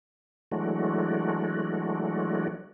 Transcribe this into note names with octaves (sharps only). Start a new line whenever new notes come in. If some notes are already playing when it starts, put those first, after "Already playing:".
E3 F#3 G#3 A3 D4 F#4